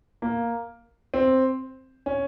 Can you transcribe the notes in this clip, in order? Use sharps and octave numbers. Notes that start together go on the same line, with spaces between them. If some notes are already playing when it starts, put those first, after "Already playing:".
A#3
C4
C#4